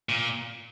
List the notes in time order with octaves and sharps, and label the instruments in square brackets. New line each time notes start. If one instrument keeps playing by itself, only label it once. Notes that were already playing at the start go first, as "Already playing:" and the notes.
[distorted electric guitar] A#2